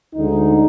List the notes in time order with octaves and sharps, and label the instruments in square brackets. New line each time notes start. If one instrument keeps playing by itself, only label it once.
[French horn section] D2 D3 G#3 D#4